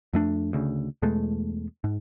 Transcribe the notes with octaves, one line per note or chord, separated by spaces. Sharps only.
F2 A3 D4
D2 C#3
E2 B2 G#3 A3
G#2